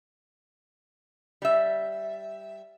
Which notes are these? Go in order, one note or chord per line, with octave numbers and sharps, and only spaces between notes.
G3 E5